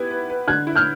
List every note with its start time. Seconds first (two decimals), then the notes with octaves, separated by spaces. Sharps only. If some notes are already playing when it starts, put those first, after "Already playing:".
Already playing: B3 E4 G4 B4 G#6
0.11 B4
0.30 B4
0.48 D3 F#6 G#6
0.67 E4
0.76 F6 G6